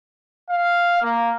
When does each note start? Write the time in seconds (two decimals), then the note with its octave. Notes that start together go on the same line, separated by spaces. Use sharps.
0.50 F5
1.02 A#3